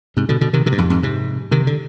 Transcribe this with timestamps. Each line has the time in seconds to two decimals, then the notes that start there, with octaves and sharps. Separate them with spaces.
0.17 G#2 C3
0.29 B2 D3
0.41 B2 D3
0.53 C3 D#3
0.66 C3 D#3
0.72 G2
0.78 F2 G#2
0.90 F2 G#2
1.03 G#2 C3
1.51 C3 D#3
1.67 D3